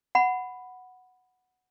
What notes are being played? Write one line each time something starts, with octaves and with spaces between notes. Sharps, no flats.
F#5 B5